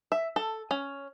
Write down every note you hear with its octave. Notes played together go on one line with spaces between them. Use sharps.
E5
A4
C#4